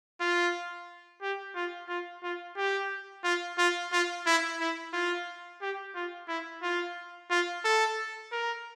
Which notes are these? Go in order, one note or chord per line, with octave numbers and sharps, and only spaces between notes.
F4
G4
F4
F4
F4
G4
F4
F4
F4
E4
E4
F4
G4
F4
E4
F4
F4
A4
A#4